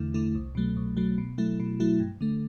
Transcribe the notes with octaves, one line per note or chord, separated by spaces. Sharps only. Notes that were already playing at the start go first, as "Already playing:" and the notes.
Already playing: E2 D3 A3 E4
D3 A3 E4
C2
B2 F#3 A3
C2
B2 F#3 A3
B2
F#3 A3 E4
B2
F#3 A3 E4
G2
D3 A3